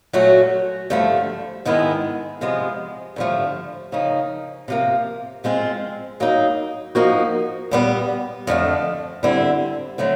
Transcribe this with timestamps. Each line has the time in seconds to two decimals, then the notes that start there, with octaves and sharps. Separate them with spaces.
0.13 A#2 F#3 A3 C#4 F#4
0.90 G2 D3 F3 A3
1.65 G#2 D#3 G#3 B3 E4
2.41 C3 F3 G#3 B3
3.16 G2 D3 F3 A3
3.92 C#3 F3 A#3 D#4
4.68 C3 F3 A#3
5.44 F3 G#3 C4 F4
6.20 F#3 A#3 D#4
6.95 F3 A#3 D#4 F#4
7.71 A#2 G3 B3
8.47 F2 D3 F3 A3 D4
9.23 D3 G3 C4 E4
9.98 D3 F#3 A3 C4